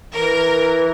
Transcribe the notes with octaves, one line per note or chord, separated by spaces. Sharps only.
E3 A#4